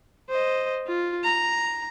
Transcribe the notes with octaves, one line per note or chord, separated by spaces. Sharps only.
C5 D#5
F4
A#5